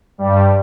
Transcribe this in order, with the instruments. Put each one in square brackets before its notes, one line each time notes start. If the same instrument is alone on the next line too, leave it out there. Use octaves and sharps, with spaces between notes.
[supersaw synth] G2 G3